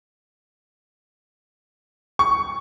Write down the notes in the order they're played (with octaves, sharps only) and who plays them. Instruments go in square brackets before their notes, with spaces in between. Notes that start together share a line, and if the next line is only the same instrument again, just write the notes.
[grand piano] C#6